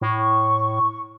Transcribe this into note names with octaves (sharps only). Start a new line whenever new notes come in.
A2 C#6